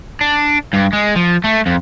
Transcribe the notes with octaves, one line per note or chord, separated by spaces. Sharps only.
D4
G2
G#3
F3
A3
F2